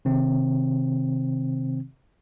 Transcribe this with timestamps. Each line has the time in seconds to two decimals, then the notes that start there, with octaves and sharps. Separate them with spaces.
0.05 C3 D#3 C4